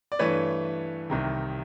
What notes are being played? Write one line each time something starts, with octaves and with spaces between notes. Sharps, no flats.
D5
G2 E3 A3 B4 C#5
C2 C3 D#3